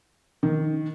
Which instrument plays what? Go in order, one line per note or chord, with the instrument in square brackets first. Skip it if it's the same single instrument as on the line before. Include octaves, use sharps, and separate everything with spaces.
[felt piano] D#3